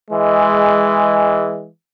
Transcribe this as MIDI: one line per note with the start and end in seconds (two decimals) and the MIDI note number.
0.11 1.66 52
0.11 1.66 56